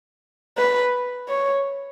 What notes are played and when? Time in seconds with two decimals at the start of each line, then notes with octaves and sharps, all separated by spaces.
0.57 B4
1.28 C#5